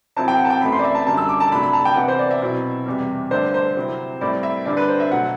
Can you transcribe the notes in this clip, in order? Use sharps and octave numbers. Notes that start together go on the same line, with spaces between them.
C3 F#3 C4 E4 A5
G5
F#5
A5
G5
F#2 E3 A3 C4 B5
C6
D5
E5
A5
F#2 D3 G3 A5
E6
D6
A5
C3 F#3 A3 D4 B5
B5
A5
G5
C3 E3 B3 F#5
C5
D5
E5
B2 F#3 C4 E4
E2 C3 G3
G2 D3 A3 D4 C5
C5
C3 F#3 C4 E4
A2 G3 C4 E4 D5
E5
G2 D3 G3 D5
B4
C5
E5
B2 F#3 A3 F#5